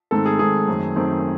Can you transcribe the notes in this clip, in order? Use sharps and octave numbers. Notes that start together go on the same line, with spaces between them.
G#2 D#3 A3 C4 A4
G#4
G#2 D#3 A3 C4 G#4
F#2 D#3 A3 C4
F#2 D#3 A3 C4